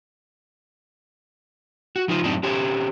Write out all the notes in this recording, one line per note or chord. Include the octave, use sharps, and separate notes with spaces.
F#4
F3 D#4 F4 C5
F#2 A2 C4 D4 D#4
C#4 G4 C5 C#5